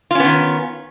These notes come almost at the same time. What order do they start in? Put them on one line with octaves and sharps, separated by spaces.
F4 C#4 B3 D#3